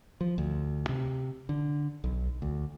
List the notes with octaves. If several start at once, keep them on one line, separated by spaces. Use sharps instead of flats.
F3
D2
C3
D3
B1
D2